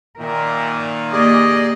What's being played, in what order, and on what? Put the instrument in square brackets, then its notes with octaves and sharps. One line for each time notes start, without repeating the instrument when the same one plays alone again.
[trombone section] A#2 D#3 [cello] A#4 E5
[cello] A#3 G4 [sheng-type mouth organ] G#4 D5 [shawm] D#5